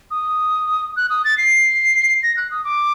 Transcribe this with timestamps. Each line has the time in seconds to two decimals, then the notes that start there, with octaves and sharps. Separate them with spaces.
0.11 D#6
0.96 F#6
1.10 D#6
1.25 A6
1.38 C7
2.23 A#6
2.37 F#6
2.51 D#6
2.65 D6